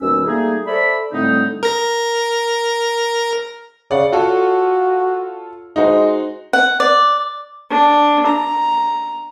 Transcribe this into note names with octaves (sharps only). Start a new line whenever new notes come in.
D#2 B2 D#3 G3 C#4 E6
G3 A3 A#3 D#4 G#4
A4 C5 D5 E5 B5
A2 D3 G3 A3 C4 D#4
A#4 A#6
C#3 D5 F#5
F4 F#4 A4 C#5
G#3 D#4 F#4 C5
F#5
D5
D4
A#5